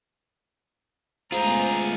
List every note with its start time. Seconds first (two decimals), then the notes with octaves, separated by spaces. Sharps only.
1.32 G#3 A3 B3 F4 G#4 C5 A#5